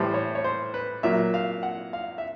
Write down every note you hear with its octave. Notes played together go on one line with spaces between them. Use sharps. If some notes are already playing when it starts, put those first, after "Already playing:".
Already playing: A2 E3 G3 C5
C#5
C#5
C5
B4
A#2 F#3 A#3 E5
F5
F#5
F5
E5